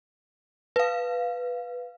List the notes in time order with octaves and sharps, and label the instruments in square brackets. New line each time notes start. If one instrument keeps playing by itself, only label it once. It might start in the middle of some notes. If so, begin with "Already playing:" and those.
[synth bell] B4 F5